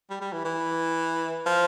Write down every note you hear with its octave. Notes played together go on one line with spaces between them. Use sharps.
G3
G3
E3
E3
F3